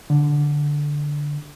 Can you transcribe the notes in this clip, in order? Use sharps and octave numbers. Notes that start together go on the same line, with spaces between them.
D3